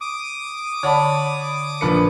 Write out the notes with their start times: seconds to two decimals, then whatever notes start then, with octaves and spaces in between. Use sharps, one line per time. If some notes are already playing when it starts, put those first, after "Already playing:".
0.01 D6 D#6
0.83 D3 C#5 D5 F#5 A5 B5
1.81 A#1 D4 A#4 B4 C#7